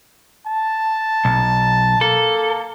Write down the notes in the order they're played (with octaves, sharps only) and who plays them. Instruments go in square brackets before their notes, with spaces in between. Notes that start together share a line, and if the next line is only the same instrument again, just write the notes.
[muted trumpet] A5
[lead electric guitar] B1
[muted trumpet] A#3 [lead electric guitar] A4